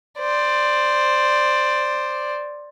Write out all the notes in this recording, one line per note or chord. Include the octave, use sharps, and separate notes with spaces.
C5 D5